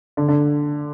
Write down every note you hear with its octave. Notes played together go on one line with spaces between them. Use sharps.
D3
D3